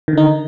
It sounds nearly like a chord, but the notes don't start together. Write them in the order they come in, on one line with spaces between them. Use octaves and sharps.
D#3 D3 D#4